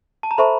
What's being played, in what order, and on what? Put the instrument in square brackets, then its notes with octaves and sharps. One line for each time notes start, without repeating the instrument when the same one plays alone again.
[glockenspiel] A5
A#5
[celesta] A4 C5 E5 A5 C#6 [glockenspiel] B5